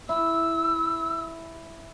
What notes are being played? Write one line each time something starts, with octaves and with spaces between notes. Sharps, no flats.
E4 E6